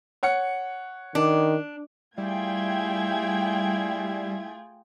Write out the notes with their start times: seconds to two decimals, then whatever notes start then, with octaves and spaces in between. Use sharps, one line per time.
0.23 C#5 F#5 C#7
1.15 D#3 D4
2.18 G3 A3 E4 F4 G#4 G5 G#6